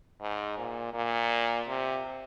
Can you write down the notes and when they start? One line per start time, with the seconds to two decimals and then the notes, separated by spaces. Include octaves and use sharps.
0.21 G#2
0.58 A#2
0.94 A#2
1.68 C3